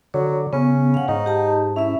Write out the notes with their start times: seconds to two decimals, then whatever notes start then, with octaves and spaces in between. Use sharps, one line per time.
0.14 D3 F#3 C#5
0.53 C#3 B3 C#4
0.94 F5 F#5
1.08 G#2 D#4
1.26 G4 A5
1.76 C#4 E4 E5